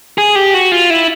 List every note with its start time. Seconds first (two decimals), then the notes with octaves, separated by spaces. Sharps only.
0.18 G#4
0.35 G4
0.54 F#4
0.72 F4
0.90 E4